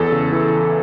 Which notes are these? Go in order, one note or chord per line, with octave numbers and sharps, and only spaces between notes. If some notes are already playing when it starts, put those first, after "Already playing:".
Already playing: E2 A4
C#3
E3